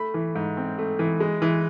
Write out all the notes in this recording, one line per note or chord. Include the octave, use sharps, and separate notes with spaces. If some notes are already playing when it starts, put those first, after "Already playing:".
Already playing: A3 B5
E3
G#2
C4
A3
E3
G#3
E3